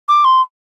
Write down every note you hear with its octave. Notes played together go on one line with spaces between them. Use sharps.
D6
C6